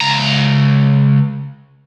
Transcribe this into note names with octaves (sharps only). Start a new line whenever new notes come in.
C#2 A#5